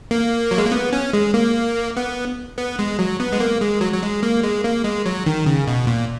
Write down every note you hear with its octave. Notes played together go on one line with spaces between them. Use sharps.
A#3
F#3
G#3
A#3
B3
C#4
G#3
A#3
B3
B3
G#3
F#3
B3
G#3
A#3
G#3
F#3
F#3
G#3
A#3
G#3
A#3
G#3
F#3
D#3
C#3
B2
A#2